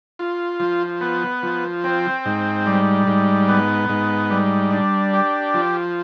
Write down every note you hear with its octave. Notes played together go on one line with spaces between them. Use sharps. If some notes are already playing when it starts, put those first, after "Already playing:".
F4
F3
B3
F3
C4
G#2
G3
G#2
B3
G#2
G3
D4
G4
F3